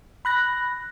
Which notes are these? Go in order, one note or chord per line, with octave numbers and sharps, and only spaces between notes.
B5 F#6 A#6